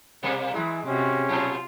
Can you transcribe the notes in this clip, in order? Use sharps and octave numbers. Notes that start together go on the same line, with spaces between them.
B2 G3 A#3
E3 G#3 E4
C3 C#4 F#4
A#2 F#3 F4